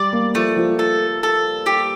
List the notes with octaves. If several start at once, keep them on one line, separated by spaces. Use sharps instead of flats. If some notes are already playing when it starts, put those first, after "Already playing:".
Already playing: G3 D5
A#3
F3 A3
F3
A4
A4
G4